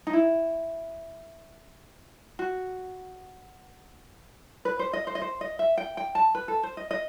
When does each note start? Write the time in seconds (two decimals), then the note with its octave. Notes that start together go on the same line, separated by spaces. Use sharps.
0.07 D#4
0.13 E4
2.39 F#4
4.65 B4
4.79 C5
4.93 D#5
5.07 C5
5.15 D#5
5.22 C5
5.41 D#5
5.59 E5
5.78 G5
5.97 G5
6.15 A5
6.35 B4
6.48 A4
6.63 C5
6.77 D#5
6.91 D#5